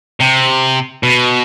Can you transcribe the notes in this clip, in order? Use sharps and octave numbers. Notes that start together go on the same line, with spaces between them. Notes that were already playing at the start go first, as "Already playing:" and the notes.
C3
B2